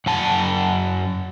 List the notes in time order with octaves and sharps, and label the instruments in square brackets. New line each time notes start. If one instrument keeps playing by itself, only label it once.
[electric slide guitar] F#2 F#5 A5